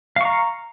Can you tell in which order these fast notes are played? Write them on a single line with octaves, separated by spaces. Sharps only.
F5 C#6 A#5